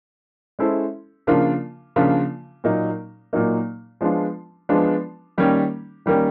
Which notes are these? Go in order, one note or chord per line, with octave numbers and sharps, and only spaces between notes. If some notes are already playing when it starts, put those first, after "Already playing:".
G#3 C#4 E4 A4 C5
C#3 F3 A#3 D4 F4
C#3 F3 A#3 D4 F4
A#2 F#3 A#3 D#4
A#2 F#3 A#3 D#4
F3 G#3 B3 D4 F4
F3 G#3 B3 D4 F4
D#3 G3 A#3 C#4
D#3 G3 A#3 C#4